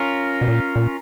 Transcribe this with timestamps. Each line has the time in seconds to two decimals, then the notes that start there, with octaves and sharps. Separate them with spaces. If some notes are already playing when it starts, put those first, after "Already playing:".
Already playing: C#4 F4 A#4
0.41 B2
0.48 A#2
0.76 A#2